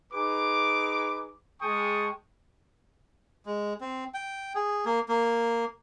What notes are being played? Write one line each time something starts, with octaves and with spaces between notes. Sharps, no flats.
D#4 G#4 B4 D6
G#3 G#4 G5 A5 C#6 D#6
G#3
C4
G5
G#4
A#3
A#3